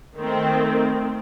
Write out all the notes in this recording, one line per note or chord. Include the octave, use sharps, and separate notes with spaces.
D#3 A3 C4